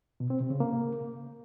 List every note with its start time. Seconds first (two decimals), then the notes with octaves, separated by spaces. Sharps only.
0.20 B2
0.30 C4
0.40 C3
0.50 C#3
0.60 A#3